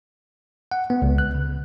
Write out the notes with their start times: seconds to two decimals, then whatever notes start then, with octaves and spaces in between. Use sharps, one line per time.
0.72 F#5
0.90 B3
1.02 C#2
1.18 F#6
1.35 C#3